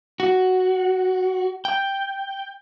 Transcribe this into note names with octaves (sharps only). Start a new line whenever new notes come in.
F#4
G5